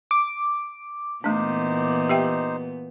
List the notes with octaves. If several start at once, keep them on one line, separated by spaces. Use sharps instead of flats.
D6
A#2 E3 A3 B3 D4 D#4 C5
G4 E5 G5